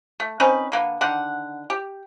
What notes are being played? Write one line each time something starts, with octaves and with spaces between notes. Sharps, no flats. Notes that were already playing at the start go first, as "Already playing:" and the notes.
A3
C4 C#4 D#4 B4
D3 A#3 B3
D3 D#3 F#5
G4